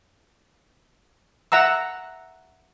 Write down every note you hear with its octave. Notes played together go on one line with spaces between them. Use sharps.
E5 F#5 A#5 E6